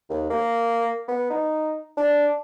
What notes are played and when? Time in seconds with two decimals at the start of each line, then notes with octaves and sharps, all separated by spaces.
0.10 D#2
0.30 A#3
1.08 B3
1.30 D#4
1.97 D4